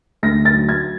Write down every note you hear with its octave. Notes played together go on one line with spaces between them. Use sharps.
D2 A#6
A6
F#3
G#6